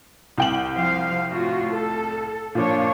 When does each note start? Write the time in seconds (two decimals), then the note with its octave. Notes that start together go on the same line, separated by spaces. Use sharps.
0.38 C2 G5 F#7
0.74 F3 C5 F5
1.32 A2 F4 F#4
1.71 A4
2.55 A#2 F3 D4 C#5